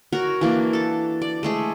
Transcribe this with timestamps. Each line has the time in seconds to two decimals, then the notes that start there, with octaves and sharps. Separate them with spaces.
0.13 F#4 A#4 C#5
0.41 E3 A#3 D4 D6
0.73 A4 A5
1.22 D5
1.43 G#3 A3 G#4